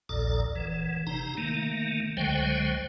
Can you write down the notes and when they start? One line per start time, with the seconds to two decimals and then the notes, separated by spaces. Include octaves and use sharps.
0.09 A#1 D#2 A#2 A4 D5
0.56 F#1 E3
1.07 C3 D#4 A#5
1.37 D#3 A3 A#3
2.17 C#2 D3 F#3 G#3 C5 G5